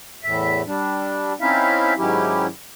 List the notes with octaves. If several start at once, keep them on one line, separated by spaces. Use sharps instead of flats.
E2 A2 E5
G3 D4
C4 C#4 D#4 E4 E5 F5
G#2 D#3 F#3 C#4 E4 G4